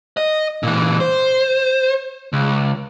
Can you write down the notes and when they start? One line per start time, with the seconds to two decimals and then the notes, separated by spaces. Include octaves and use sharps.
0.17 D#5
0.63 A#2 E3
1.00 C5
2.33 C#2